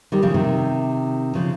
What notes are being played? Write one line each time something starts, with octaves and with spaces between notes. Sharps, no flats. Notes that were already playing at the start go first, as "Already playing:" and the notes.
D#3 G3
C#3 F3
C3 D#3
C#3 F3